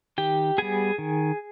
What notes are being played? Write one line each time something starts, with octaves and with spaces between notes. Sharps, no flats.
D#3 G4 G5
G3 B3 G#4 G#5
D#3